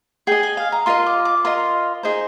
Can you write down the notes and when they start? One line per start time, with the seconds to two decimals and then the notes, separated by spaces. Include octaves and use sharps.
0.27 G#4 D#5 G5
0.43 G#5
0.57 F5
0.72 A#5
0.86 F4 A#4 D#5 C6
1.06 D6
1.25 D6
1.45 F4 A#4 D#5 C6
2.03 D#4 G#4 C5